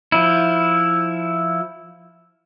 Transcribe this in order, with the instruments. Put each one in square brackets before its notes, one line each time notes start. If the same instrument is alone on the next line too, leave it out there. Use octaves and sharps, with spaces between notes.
[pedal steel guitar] F3 E4